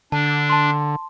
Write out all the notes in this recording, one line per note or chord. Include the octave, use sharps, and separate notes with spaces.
D3 D4 A5
A5 C6